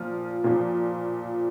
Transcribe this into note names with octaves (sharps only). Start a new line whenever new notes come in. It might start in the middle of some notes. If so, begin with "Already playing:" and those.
Already playing: A#2 F3 F6
A#2 F3